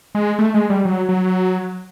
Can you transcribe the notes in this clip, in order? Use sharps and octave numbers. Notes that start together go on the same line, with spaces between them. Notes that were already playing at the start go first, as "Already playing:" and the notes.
G#3
A3
G#3
G3
F#3
F#3